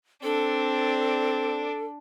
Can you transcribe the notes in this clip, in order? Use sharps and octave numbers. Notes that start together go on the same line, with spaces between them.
C4 D4 A4 D5